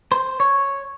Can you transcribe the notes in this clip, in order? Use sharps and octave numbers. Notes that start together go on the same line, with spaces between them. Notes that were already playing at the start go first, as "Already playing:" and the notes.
C5
C#5